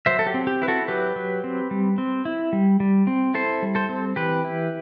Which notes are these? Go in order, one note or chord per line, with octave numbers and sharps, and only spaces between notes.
F#3 C5 E5
A4
G4
C4
G4
E4 B4
F#4 A4
F#3 G4 B4
F#3
C4
G3
C4
E4
G3
G3
C4
E4 A4 C5
G3
A4 C5
C4
E3 G4 B4
E4